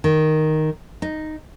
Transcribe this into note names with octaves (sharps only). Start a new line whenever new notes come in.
D#3
D#4